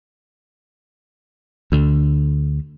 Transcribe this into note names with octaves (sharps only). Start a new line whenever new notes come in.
D2 D3